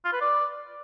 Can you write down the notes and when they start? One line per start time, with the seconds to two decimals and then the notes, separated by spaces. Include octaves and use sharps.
0.05 F4
0.13 B4
0.21 D5